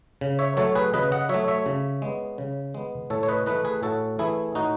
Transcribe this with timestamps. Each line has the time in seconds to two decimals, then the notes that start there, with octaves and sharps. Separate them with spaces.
0.21 C#3
0.39 C#5 E5
0.57 F#3 A3 A4 C#5
0.75 G#4 B4
0.94 C#3 B4 D#5
1.12 D#5 F#5
1.29 F#3 A3 C#5 E5
1.48 C#5 E5
1.66 C#3
2.02 G#3 B3
2.38 C#3
2.74 G#3 B3
3.10 A2 A4 C#5
3.23 C#5
3.29 B4 D#5
3.46 E3 A3 B4 D#5
3.65 G#4 B4
3.83 A2 F#4 A4
4.19 E3 A3 E4 G#4
4.55 A2 D#4 F#4